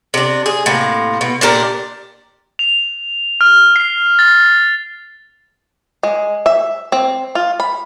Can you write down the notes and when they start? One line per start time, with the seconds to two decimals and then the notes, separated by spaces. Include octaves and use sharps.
0.14 C3 D4
0.46 G#4
0.66 A2 C3 A#3
1.21 B2
1.41 A#2 D4 G4 A#4
2.59 F7
3.41 F6
3.76 C7
4.19 A6
6.03 G#3
6.46 E5
6.92 C4
7.35 F4
7.60 B5